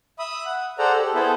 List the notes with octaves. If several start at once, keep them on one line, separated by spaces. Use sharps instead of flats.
E5 B5 D#6
F#5
G#4 A4 C5 D5 F#5 A#5
G4 A4
B3 E4 G#4 A4 B4 C5